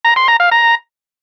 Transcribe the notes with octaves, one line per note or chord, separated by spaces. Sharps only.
A#5
C6
A#5
F5
A#5